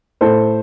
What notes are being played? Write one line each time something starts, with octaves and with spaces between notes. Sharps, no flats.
A2 A4 C5